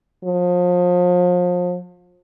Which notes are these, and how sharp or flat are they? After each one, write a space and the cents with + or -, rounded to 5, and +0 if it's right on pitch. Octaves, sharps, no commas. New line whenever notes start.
F3 +35